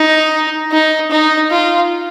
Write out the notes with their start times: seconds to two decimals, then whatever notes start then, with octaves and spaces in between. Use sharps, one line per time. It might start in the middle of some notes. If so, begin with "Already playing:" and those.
Already playing: D#4
0.72 D#4
1.11 D#4
1.51 F4